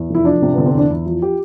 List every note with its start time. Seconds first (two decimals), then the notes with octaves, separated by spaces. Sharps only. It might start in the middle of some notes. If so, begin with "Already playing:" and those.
Already playing: E2
0.10 F1
0.15 E4
0.25 F3 D4
0.42 C3
0.54 D3 B3
0.66 C4
0.74 E2 D4
0.90 E2 E4
1.06 F3
1.22 G4